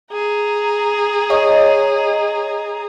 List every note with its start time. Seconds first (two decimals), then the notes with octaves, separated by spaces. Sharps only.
0.12 G#4 A#5
1.30 C#5 D#5